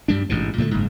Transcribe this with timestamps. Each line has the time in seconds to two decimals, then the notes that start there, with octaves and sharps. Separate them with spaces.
0.08 G2 G3 D4
0.29 A1 G#2 B2
0.58 A#2 D3 G3 A3
0.71 F#1 G#2